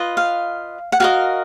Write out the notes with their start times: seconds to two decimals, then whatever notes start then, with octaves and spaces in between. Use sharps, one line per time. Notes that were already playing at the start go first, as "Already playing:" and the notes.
Already playing: F4 B4 D#5
0.17 F5
0.92 F#5
1.00 F#4 A#4 D#5 F5